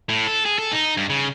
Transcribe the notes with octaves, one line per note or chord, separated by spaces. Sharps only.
A2
A4
G#4
A4
D#4
G2
C#3